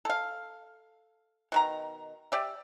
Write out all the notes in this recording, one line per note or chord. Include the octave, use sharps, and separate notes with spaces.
A4 F5
B2 D#3 A#5
G4 D5 E5